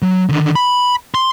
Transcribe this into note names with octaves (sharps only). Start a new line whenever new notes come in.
F#3
D3 D#3
B5
C6